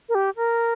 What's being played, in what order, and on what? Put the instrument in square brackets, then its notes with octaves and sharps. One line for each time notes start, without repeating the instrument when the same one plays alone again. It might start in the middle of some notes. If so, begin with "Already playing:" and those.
[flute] A#4
G4
A#4